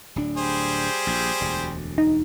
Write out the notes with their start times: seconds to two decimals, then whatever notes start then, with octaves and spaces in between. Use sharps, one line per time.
0.16 D1 D4
0.37 G3 G#4 C5
1.07 A#1
1.41 E1 D2
1.98 D#4